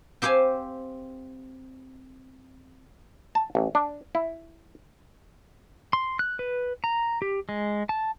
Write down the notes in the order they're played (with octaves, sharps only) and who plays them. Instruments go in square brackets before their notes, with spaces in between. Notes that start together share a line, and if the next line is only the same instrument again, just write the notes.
[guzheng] C4 G4 C5 F5 G#5
[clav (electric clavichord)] A5
A1
D4
E4
[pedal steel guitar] C6
F#6
B4
A#5
G4
G#3
A5